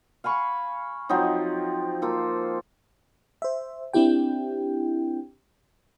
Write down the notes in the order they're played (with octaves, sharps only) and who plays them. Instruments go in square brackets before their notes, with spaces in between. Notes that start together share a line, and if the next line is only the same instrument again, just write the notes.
[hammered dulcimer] F5 G#5 B5 C#6
F3 F#3 C4 D#4
A#3 F4 A4
[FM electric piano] C5 E5
C4 D4 E4 G4 G5